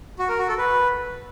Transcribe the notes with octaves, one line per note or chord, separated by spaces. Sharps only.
F#4
A#4
F#4
A4
B4